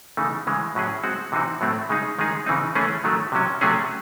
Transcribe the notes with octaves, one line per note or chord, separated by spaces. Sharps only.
C#3 E3 A3 D#4
C#3 E3 G#3
A2 F#3 C#4 G#4
G#3 C4 F#4
C3 E3 C4 D#4 F#4
A2 F#3 A3 C4
C#3 G#3 D#4 G#4
D#3 G#3 D#4 G#4
C#3 E3 C4 D#4
E3 A3 C#4 G#4
D#3 F#3 A3
C3 F#3 C#4
C3 F#3 A3 C#4 G#4